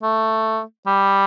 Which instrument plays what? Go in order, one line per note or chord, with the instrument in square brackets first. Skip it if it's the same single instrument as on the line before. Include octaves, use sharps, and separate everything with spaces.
[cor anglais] A3
G3